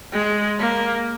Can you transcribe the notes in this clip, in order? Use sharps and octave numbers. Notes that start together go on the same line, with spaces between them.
G#3
A#3